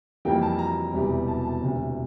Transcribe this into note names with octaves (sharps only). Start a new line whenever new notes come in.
F2 E3 G3 A#3 G5
A5
A#5
E1 E2 C3 G3
A5
A5
E1 D2 C3